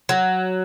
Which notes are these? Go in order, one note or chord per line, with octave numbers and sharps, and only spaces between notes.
F#3